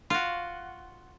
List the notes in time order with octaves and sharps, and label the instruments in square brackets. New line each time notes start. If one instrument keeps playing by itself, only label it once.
[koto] F4 F#4